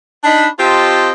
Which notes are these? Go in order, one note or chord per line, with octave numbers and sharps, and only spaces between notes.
D4 D#4 B5
C4 F4 G4 C5 D#5 A5